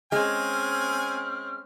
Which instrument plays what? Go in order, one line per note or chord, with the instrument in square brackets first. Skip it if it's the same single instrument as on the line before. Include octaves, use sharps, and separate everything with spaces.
[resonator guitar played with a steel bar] G#3 [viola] C4 C#4 [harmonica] G#5 [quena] F6